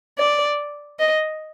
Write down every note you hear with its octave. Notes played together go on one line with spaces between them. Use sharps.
D5
D#5